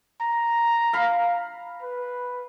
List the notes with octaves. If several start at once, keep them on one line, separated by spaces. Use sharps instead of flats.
A#5
F5 B5
B4